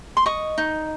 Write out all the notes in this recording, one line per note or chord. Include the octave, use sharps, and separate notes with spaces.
C6
D#5 C#6
D#4